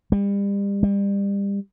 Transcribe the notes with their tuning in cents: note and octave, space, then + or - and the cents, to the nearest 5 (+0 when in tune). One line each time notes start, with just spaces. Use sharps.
G3 +35
G3 +30